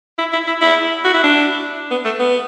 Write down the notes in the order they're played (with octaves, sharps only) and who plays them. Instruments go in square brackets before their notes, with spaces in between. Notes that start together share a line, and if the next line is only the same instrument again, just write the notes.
[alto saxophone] E4
E4
E4
E4
F#4
E4
D4
B3
A3
B3